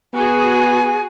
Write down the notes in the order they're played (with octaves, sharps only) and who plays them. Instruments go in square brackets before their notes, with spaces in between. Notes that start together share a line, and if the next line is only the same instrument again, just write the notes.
[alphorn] B3 [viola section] F#4 G#4 [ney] G#5